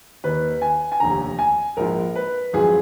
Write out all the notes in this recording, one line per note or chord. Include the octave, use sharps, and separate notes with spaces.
D#2 D#3 B4
G#5
G#5
F1 D#2 D3 A#5
G#5
A#1 G#2 F3 A#4
B4
G#1 F#2 F3 G#4